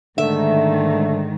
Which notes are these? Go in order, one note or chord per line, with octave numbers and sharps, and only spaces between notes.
G#2 D3 D#3 A3 E5